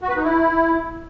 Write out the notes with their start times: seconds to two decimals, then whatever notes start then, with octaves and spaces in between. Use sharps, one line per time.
0.01 F#4
0.09 B4
0.17 D#4
0.24 E4